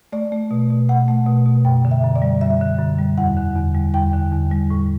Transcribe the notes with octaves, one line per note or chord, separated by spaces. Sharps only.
A3 D5
A3
B2
B2
A3 F#5
A3
B2
B2
F#2 G5
D3
E5
F#2
D5
G3
F#2 E5
D3
F#2
G3
E2 F#5
D3
E2
G3
E2 G5
D3
E2
G3
A2